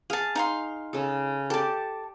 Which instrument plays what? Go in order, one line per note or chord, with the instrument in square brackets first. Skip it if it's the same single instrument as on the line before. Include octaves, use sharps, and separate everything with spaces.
[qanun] G#4 [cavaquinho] F5 A5
[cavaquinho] D#4 F5 C6
[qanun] C#3 A4
[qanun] G4 D5 [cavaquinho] A4 A5